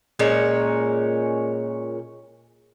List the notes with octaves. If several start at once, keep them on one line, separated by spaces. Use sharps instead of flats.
A#2 G#3 C#4